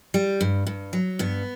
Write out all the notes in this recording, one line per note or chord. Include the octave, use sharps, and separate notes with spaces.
G3
G2
G2
F#3
G2 B3